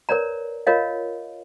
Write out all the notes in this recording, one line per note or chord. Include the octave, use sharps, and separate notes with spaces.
A#4 B4 C#5 D5 A#5
F4 A#4 C#5 D#5 F5